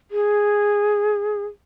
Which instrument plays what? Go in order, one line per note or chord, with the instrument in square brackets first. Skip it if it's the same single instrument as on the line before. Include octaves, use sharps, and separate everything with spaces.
[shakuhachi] G#4